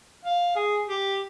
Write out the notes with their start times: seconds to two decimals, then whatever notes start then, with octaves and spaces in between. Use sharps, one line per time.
0.25 F5
0.56 G#4
0.86 G4